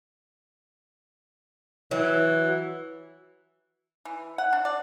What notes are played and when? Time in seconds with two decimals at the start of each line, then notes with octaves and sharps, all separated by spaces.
1.91 E3 F#3
4.05 E3
4.38 F#5
4.53 D4
4.65 D5